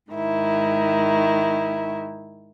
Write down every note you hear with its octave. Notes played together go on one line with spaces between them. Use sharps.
G#2 D#3 E4